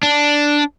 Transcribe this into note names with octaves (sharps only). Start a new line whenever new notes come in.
D4